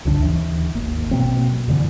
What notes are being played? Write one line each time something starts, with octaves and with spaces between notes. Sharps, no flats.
C#2 G2 D3 D4
D#2 E3
G#1 A#3
B2 F#3 A#3 C4
F2 G#2 D3 E3